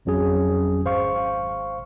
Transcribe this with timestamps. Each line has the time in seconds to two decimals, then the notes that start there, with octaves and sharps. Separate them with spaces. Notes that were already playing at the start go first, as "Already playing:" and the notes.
0.05 G#1 F2 F#3 C#4 G#4
0.85 G#1 C5 F5 C#6